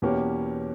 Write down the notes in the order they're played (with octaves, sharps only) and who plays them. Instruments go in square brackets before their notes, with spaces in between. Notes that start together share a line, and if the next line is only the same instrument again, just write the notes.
[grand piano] E2 B2 A#3 C#4 G4